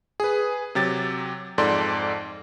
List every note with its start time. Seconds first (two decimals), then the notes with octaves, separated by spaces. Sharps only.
0.20 G#4 B4
0.75 C3 F#3 G4 A6
1.58 F2 G#2 A4 D5 C6